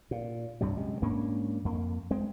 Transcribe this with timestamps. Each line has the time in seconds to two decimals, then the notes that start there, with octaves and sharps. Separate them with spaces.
0.11 A#2
0.61 C2 G2 C3 F#3
0.77 F#2 C3 G#3
1.02 G#2 A#3 C#4 D4
1.65 F2 A#3
2.11 G#3 C4